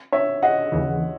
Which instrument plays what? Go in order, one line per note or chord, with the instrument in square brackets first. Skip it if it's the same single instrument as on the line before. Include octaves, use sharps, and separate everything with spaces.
[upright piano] C#5 E5
D#5 F#5
[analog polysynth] D#2 C#3 E3